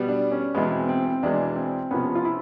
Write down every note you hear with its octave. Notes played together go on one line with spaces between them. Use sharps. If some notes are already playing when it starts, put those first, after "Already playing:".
Already playing: B2 G3 B3
D4
C#4
E2 B2 G#3 B3
C4
C4
C4
E2 B2 G#3 D4
C4
C3 F3 A#3 B3 C#4
F4
E4